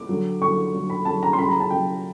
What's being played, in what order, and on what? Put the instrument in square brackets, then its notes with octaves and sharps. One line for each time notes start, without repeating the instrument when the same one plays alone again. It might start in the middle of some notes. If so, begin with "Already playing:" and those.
Already playing: [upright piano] D6
D3 F#3
D3 F#3 C#6
D3 F#3
B5
D3 F#3 A5
A#5
C6
C#3 F#3 B5
A#5
A5
C#3 F#3 G5